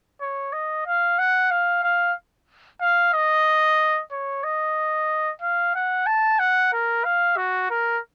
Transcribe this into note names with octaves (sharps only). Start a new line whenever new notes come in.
C#5
D#5
F5
F#5
F5
F5
F5
D#5
C#5
D#5
F5
F#5
A5
F#5
A#4
F5
F#4
A#4